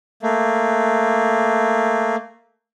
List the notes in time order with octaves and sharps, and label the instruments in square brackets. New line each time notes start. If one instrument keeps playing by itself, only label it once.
[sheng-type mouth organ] A3 A#3